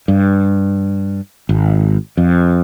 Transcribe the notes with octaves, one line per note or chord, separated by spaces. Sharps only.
G2
G#1
F2